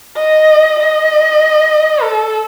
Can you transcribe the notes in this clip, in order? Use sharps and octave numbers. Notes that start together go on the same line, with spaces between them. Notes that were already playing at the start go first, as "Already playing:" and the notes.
D#5
D#5
A4